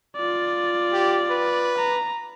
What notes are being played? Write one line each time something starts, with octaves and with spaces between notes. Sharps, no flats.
F4 D5
G4
B4
A#5